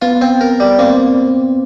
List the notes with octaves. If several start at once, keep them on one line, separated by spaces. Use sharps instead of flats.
B3 F4 B4
C4
A#4
G3
A#3 C4 C5